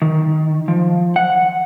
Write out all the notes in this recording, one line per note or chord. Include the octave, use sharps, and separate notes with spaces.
D#3
F3
F#5